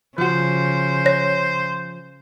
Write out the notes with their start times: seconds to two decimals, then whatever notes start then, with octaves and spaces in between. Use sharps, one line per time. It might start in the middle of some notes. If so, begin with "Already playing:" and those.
0.18 C#3 F3 F#4 C5
1.06 C#5 A#6